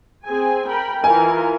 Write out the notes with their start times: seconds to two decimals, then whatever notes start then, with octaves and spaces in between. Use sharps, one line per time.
0.24 C4 G#4 G#5
0.69 A#4 G5 B5
1.04 E3 F4 A#4 G#5